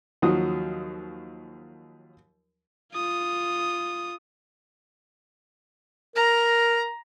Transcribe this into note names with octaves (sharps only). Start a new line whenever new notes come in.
D#2 F3 F#3 D#6
F4 D#6
A#4 A#5